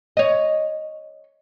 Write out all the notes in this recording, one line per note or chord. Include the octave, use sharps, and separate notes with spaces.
C#5 D#5